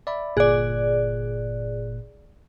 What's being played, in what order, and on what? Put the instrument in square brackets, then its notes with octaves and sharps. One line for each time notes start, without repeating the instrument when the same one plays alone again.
[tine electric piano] D5 E5 B5
[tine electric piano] G1 A#2 F#6 [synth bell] G#4 D5